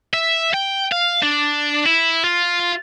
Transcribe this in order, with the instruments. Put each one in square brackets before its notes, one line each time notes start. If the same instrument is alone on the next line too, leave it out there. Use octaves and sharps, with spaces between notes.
[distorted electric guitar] E5
G5
F5
D4
E4
F4